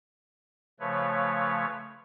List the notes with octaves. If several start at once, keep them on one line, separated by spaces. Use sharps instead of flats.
C#3 F3 A3 B4 C#5